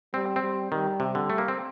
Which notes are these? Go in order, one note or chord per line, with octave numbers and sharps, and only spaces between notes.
G3 C4
C4
G3
D#3 G3
C3
D3
A3
A#3
C4